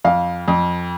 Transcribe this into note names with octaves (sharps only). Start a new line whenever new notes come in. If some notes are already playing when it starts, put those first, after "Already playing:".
F2 F5
F2